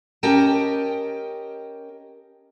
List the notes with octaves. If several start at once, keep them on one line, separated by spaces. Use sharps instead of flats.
C#4 G4 A#4 D#5 G5 A5